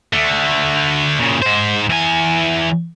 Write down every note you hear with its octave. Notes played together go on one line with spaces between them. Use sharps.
D3 A3
A#2 C#3
G#2 C5
E2 G#5